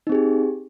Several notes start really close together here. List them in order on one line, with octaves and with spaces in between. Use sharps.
D#4 C4 G#4 G4